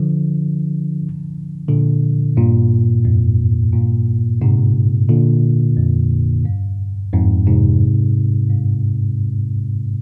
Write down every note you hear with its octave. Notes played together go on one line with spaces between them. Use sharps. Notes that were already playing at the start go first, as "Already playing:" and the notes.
Already playing: D3 F3
A#2 D3
G2 A#2
F2 G#2
G2 A#2
G#2 C3
A#2 D3
F2
G2
F2 G#2
G#2 C3
G2